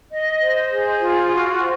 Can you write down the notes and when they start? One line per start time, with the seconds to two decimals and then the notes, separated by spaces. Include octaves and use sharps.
0.11 D#5
0.41 C5
0.70 G#4
1.00 F4
1.30 F#4
1.60 C5